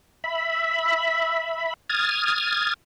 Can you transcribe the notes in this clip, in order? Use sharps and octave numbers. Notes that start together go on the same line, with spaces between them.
E5 B5
D#6 F6 G#6 A6